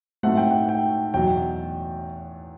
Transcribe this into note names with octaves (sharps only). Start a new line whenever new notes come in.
A2 F#3 A3 C4 D#4 F#5
G5
F#5
G5
E2 B2 F#3 G5